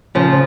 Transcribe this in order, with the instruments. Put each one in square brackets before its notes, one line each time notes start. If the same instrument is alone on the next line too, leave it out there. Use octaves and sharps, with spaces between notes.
[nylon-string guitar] C#3 F3